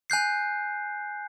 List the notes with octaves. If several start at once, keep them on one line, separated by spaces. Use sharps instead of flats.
G#5 F#6 G6 C7